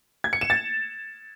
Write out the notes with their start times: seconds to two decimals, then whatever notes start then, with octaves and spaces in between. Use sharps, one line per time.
0.24 G#6
0.33 C#7
0.41 E7
0.50 A6